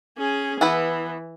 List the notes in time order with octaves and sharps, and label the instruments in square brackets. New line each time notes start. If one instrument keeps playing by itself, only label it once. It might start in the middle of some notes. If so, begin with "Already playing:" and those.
[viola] C#4 G#4
[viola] E3 [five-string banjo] B3 E4 B4